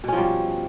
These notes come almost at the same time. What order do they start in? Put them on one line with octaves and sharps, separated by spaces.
B2 C#4 F3 G3